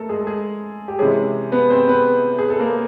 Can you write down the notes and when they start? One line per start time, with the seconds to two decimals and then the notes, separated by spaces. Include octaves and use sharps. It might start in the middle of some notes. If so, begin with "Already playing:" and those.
Already playing: A3 A4 A#4
0.09 G#3 G#4
0.21 A4
0.27 G#3 G#4
0.88 G4
0.99 C3 E3 G#3 C#4 G#4
1.52 B3 B4
1.70 C4 C5
1.88 B3 B4
2.39 G#4
2.50 A4
2.59 A#3 A#4